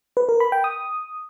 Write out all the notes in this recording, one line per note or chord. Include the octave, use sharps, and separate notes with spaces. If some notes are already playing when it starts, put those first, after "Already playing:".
B4
A#4
B5
G5
D#6